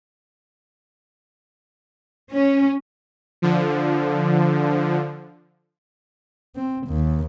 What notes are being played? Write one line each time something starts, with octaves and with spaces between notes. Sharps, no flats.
C#4
D3 F3
C4
D#2